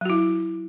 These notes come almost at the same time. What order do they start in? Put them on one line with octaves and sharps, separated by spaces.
F#3 F#4 E4